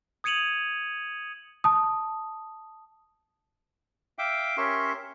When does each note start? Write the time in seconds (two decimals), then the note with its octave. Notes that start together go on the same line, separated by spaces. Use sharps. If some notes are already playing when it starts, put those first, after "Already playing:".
0.24 D#6 G#6 C#7 D#7 F7 F#7
1.64 A5 D#6
4.19 E5 F5 G5 D6
4.57 C#4 G4 A#4 E5 C6 C#6